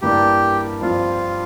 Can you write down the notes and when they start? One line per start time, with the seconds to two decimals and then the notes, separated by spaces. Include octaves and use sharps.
0.02 G2 E3 A#3 D4 G4
0.81 G2 F3 C4 F4